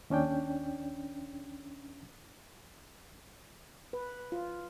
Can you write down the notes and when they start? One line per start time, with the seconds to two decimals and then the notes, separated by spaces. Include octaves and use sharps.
0.10 D#2 C#4 D4 G5
3.93 B4
4.32 F4